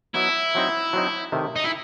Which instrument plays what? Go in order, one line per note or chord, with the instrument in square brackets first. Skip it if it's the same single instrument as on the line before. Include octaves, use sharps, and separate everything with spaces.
[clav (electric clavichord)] F#3 B3 D#4 [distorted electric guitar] E4
[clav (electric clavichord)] F#3 C4 D#4
F#3 C4 D#4
C3 D#3 A3
[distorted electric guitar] D#4
E4